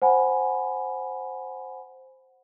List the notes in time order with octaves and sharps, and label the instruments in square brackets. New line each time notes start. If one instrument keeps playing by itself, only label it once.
[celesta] C5 F#5 G#5 B5